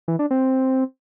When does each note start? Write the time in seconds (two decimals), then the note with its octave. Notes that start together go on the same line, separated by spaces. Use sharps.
0.08 E3
0.19 D4
0.31 C4